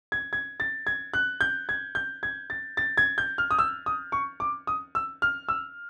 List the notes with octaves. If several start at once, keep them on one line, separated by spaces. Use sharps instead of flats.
G#6
G#6
A6
G#6
F#6
G6
G#6
G6
G#6
A6
A6
G#6
G6
F6
D#6
E6
D#6
C#6
D6
D#6
E6
F6
E6